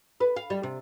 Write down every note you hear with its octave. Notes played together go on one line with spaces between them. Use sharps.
B4
F5
G3
C3